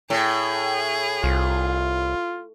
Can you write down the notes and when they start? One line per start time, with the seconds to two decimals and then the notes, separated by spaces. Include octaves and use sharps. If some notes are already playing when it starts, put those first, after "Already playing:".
0.10 A2 G#4
1.24 C2 F4